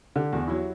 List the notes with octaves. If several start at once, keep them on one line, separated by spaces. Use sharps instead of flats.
D3 G4
E2 F#4
F#3 E4